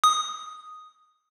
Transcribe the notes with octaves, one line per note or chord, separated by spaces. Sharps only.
D#6